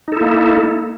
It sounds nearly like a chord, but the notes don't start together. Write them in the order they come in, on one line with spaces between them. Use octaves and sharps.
D#4 A4 E4 A#3